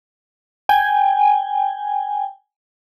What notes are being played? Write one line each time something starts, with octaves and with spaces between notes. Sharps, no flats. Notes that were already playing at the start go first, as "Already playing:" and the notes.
G5 G#5